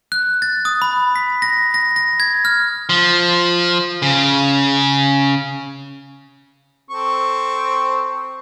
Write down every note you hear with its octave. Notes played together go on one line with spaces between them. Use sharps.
F#6
A6
D#6
B5
B6
A#6
A#6
A#6
G#6
F6
F3
C#3
C4 A4 C#6